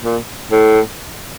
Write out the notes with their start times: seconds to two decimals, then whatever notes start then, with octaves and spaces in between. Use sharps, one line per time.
0.03 A#2
0.51 A2